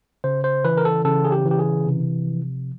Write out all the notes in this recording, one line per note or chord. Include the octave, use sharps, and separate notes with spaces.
C#3 C5
C5
E3 B4
A#4
A4
C#3 A4
G#4
G4
E3
G4
G#4
C3
F3